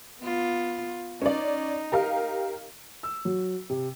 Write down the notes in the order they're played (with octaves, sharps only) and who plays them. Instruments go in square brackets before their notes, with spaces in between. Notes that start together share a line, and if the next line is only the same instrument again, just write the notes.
[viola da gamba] B3 F4
[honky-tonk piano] C#4 D5 [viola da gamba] D#4
[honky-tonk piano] G4 A#4 F5
[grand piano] E6
F#3
C3